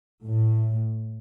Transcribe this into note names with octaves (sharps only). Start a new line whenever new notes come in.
A2